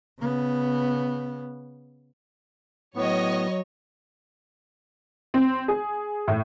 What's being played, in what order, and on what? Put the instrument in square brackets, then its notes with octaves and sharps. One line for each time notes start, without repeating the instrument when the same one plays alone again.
[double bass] C#3 B3
[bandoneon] A2 B3 [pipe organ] F#3 [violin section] C#5 D#5
[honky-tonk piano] C4
G#4
A2